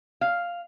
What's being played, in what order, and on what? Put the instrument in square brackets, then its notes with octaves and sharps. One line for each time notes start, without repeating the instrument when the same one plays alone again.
[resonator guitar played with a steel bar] F5